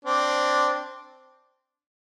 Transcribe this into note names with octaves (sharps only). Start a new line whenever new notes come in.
C4 D4